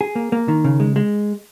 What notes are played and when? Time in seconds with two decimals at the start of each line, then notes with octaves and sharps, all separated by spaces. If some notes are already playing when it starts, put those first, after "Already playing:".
0.01 G#4
0.15 A#3
0.32 A#3
0.48 D#3
0.64 C#3
0.80 G#3
0.96 G#3